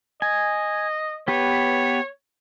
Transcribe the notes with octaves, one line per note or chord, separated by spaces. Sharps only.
D#5 G#5
B3 G4 B4 C#5